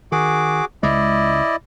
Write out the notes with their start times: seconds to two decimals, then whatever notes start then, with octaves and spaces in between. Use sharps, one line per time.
0.12 D#3 F#4 G#4 D6
0.83 C#2 G#3 E4 D5 D#5